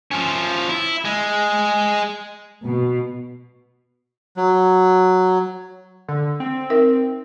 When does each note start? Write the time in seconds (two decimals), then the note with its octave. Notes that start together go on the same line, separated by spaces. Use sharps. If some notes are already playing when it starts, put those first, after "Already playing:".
0.11 F3 C#4
0.69 E4
1.05 G#3
2.65 B2
4.37 F#3
6.08 D3
6.40 C4
6.70 D#4 A#4 E5